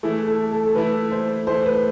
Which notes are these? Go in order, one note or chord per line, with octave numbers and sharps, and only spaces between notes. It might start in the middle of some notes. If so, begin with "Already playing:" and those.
E3 A3 E4 G#4
A4
A4
A4
E3 A3 E4 B4
C5
E3 A3 E4 C5
B4